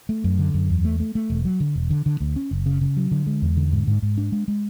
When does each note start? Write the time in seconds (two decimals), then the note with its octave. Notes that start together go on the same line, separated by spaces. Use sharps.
0.09 A3
0.24 F#2
0.39 D3
0.54 F#2
0.70 E2
0.85 A3
1.00 A3
1.15 A3
1.30 E1
1.45 F#3
1.60 D3
1.75 E1
1.90 D3
2.06 D3
2.20 D2
2.36 C#4
2.51 F#1
2.66 C#3
2.81 C#3
2.97 F#3
3.11 D3
3.27 G#3
3.42 E2
3.57 D3
3.72 G#2
3.87 G#2
4.02 G#2
4.18 D4
4.32 G#3
4.48 G#3